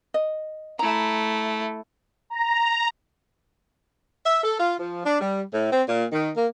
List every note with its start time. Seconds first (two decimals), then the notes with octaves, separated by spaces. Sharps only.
0.14 D#5
0.79 A3 E4 A#5
2.30 A#5
4.25 E5
4.44 A4
4.60 F4
4.80 F3
5.05 D4
5.20 G3
5.53 A2
5.72 C4
5.88 A#2
6.12 D#3
6.37 A#3